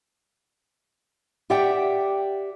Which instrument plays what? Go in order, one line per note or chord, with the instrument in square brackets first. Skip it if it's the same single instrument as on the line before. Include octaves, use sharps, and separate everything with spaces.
[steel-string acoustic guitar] G4 D5 E5 F#5 G5